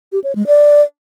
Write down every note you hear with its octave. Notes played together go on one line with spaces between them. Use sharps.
G4
C#5
G#3
D5